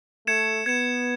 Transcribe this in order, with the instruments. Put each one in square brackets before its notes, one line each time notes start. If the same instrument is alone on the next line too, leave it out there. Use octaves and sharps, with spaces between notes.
[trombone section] A3 [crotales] G#6 C#7 E7
[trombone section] B3 [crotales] G#6 C#7 E7